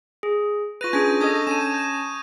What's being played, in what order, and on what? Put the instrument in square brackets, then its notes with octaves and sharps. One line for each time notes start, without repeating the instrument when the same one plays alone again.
[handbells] G#4
[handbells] F4 B4 [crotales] C#6 A#6 D#7
[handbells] C#4 D4 G#4 [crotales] G6 G#6 A#6
[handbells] D4 A4 D#5 [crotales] D#6 G#6
[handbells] C#4 A5 [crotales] D#7 E7
[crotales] G6 E7